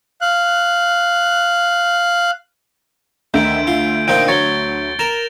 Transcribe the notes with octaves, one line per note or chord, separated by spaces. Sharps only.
F5 F#6
D2 D3 D#3 E5 G6 D7
F4
A#2 C4 D#4 G5
F#3 C#5 A6 G7
A#4 A6 E7 F7